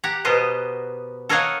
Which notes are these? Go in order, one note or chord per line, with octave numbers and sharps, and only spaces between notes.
G4 F#5 A#5
B2 B3 A#4 C5 D#5
A4 A#4 C#5 D#5 F5 F#5